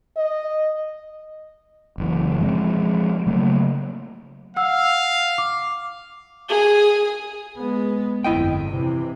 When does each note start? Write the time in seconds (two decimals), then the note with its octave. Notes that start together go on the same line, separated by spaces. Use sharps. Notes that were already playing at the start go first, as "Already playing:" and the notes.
0.17 D#5
1.98 F#1 E3
2.40 F3 G#3 C4
3.27 C#3 F#3 A3 A#3
4.56 F5 F#5 E6
5.38 D6
6.49 G#4
7.57 G#3 B3
8.24 G1 F2 E4 D#5 G5
8.68 C3 E3